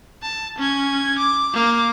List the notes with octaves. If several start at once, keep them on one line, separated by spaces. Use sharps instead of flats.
A5
C#4 G#6
D6
A#3 D6